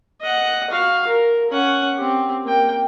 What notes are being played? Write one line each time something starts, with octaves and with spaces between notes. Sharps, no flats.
D#5 F#5
F#4 F5
A#4
C#4 F#5
C4 G4
A#3 G5